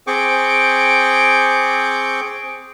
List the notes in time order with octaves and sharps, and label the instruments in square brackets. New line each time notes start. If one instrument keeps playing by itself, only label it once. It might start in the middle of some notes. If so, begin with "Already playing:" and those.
[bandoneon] C4 G#4 G5 C#6 D6